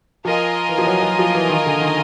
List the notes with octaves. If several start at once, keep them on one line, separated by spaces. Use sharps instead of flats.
F3 F4 A#4 D#5 G#5
E3
F3
F#3
F#3
F3
E3
D#3
D3
D#3